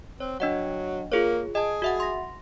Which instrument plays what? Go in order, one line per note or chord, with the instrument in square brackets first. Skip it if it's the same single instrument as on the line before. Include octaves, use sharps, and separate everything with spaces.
[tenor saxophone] C4 [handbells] C#5
[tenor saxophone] F#3 [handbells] D4 D#5 F#5
[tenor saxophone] A#3 [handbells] F4 G#4 C#5
[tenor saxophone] G#4 [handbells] D#5 A5
[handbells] F#4 E5 F#5
C6 A#6